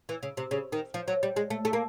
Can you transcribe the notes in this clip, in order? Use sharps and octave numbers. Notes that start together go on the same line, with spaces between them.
E3
C#3
C3
C#3
D#3
F3
F#3
G3
G#3
A3
A3
A#3